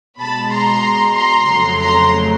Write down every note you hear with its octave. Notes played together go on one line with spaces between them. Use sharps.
B2 G#3 A5 B5
A#5 C6
A#5 C6
F2 C#3 F#3 A3
A#5 C6